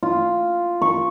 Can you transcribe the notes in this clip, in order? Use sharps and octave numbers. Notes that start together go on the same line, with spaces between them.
F4
C#6